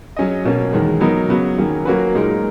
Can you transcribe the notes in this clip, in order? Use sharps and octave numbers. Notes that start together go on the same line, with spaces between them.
F#3 C#4 G#4 D#5
B2 A#3 C#4
E2 D#3 G#3
F#3 B3 D#4 A#4
C#3 F#3 B3 F#4
D#3 F#3 A#3 C#4 G#4
F#3 A#3 C#4 F#4 B4
A#2 G#3 D#4 A#4